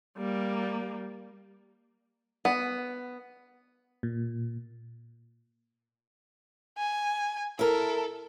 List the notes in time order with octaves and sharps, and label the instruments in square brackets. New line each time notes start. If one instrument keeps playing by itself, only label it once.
[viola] G3 A#3
[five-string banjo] B3
[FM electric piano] A#2
[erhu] G#5
[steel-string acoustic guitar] E4 A#4 [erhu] A4